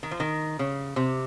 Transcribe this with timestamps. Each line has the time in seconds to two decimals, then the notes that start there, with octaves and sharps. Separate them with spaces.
0.03 D#3
0.11 F3
0.20 D#3
0.59 C#3
0.96 C3